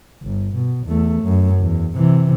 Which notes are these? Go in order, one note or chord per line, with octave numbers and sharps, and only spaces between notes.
G1
B2
E2 A3
F#2
E2
C3 E3